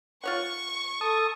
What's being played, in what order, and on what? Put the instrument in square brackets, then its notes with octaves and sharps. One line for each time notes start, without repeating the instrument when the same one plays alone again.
[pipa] F4 C#5 F#5 [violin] C#6
[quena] A4 [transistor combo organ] A5 D#6